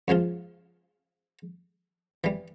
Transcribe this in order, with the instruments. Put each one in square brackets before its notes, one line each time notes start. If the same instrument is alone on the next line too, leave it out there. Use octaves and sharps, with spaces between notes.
[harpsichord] C#2 C#3 F3 F4
E3 G3